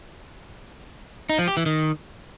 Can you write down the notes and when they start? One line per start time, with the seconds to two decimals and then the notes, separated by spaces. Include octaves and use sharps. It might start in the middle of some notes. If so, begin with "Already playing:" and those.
1.29 D#4
1.39 F3
1.48 G4
1.57 E3
1.66 D#3